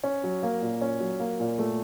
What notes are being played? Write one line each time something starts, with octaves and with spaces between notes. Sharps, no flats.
C#4
F#3
A#3
A#2
C#4
F#3
A#3
A#2
A3